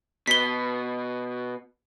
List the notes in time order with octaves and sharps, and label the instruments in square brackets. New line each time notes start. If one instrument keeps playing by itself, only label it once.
[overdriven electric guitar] B2 [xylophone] B6 G7